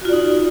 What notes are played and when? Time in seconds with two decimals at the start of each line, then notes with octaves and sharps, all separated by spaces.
0.01 F#4
0.05 F4
0.09 D5
0.13 D#4